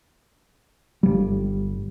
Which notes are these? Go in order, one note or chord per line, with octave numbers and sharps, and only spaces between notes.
G1 G3